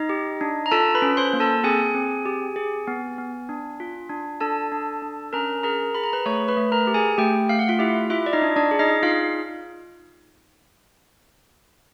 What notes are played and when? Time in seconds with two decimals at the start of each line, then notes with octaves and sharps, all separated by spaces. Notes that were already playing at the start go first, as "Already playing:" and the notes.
Already playing: D#4 D#5
0.09 G4
0.41 D4
0.66 A#5
0.71 F4 A4 A5
0.95 B4 B5
1.02 C#4
1.17 C5 C6
1.33 A#3
1.40 A4 A5
1.64 C4 G#4 G#5
1.95 C4
2.26 G4
2.56 G#4
2.87 B3
3.18 B3
3.49 D4
3.80 F4
4.10 D4
4.41 D4 A4 A5
4.72 D4
5.02 D4
5.33 C#4 A#4 A#5
5.63 G#4 A#4 A#5
5.95 G#4 B5
6.04 A#5
6.13 B4 B5
6.26 A3 C#5 C#6
6.48 B4 B5
6.57 A3
6.72 A#4 A#5
6.87 G4
6.94 G#4 G#5
7.18 A3 G4 G5
7.49 A3 F5
7.59 F#5
7.68 F4 F5
7.79 E4 G4 E5
8.10 E4 F4 E5
8.26 D5
8.33 D#4 D#5
8.42 D4
8.56 D4 D5
8.71 G#4
8.79 D#4 D#5
9.03 D#4 F4 F5